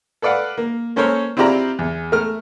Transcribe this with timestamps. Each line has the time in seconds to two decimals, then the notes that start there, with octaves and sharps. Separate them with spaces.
0.22 A4 B4 D5 F5 F#5
0.57 A#3
0.96 A#3 C#4 A4 A#4 C5 C#5
1.37 C4 E4 F4 G4 D5 A#5
1.79 E2
2.12 A3 A#4 F6